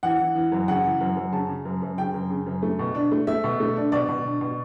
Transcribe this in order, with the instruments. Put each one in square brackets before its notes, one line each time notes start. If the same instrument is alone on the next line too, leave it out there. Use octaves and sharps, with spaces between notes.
[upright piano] E3 F#5
E3
E3
F#2
C#3 F#5
E3
F#2
F#2
C#3 A5
C#3
F#2
F#2
C#3 G5
F#2
C#3
F#2
A3
B2
D4
A3
A3 E5
B2
A3
D4
B2 D5
B2
D4
B2